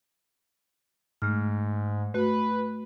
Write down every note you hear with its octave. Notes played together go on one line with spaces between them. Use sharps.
G#2 A3 F6
A3 F#4 B4